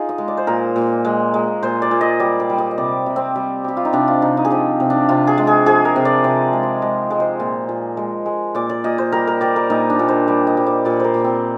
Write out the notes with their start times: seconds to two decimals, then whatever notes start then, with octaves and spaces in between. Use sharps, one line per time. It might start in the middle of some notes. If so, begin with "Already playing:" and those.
Already playing: D#4 F4 G#4
0.09 D#5
0.18 G#3
0.28 D5
0.37 C5
0.47 A#2 A#4
0.76 A#2
1.05 G#3
1.34 G#3
1.63 A#2 C5
1.82 D5
1.91 A#2
2.01 D#5
2.20 G3 D5
2.40 D5
2.50 G3
2.58 D#5
2.71 D#5
2.78 C3 D5
3.06 C3
3.16 C4
3.36 G3
3.64 G3 G4
3.77 F4
3.85 D#4
3.93 C3 D4
4.08 F4
4.22 C3 D#4
4.37 D#4
4.45 G#4
4.51 F3 G4
4.80 C3
4.90 D4
5.09 C3 F4
5.27 G#4
5.38 G#3
5.47 G#4
5.66 F3 G#4
5.85 A#4
5.96 C3
6.05 D5
6.24 C3 D5
6.53 G#3
6.63 D5
6.82 G#3 D#5
7.10 G#3
7.20 C5
7.40 A#2
7.69 A#2
7.97 G#3
8.26 G#3
8.55 A#2 D5
8.69 D5
8.84 A#2 D#5
8.98 C5
9.12 G3 A#4
9.27 A#4
9.41 G3 D5
9.56 A#4
9.70 A#2 D#4
9.90 D4
9.99 A#2
10.08 C5
10.28 G3 D5
10.47 D#5
10.57 G3
10.67 D5
10.85 A#2 D5
11.00 A#4 C5
11.14 A#2
11.24 C4